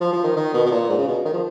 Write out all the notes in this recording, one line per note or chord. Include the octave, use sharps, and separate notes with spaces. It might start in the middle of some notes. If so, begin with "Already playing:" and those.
F3
F3
D#3
D#3
B2
B2
A#2
G#2
C#3
B2
D#3
F3